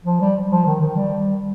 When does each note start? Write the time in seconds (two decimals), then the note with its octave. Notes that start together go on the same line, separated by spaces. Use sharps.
0.05 F3
0.21 G3
0.50 F3
0.66 D#3
0.81 D#3
0.96 G3